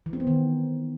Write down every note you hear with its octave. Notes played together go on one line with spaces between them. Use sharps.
E3
C4
B3
D#3